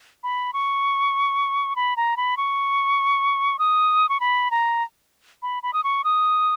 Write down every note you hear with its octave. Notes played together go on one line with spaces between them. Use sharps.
B5
C#6
B5
A#5
B5
C#6
D#6
C#6
B5
A#5
B5
B5
D#6
C#6
D#6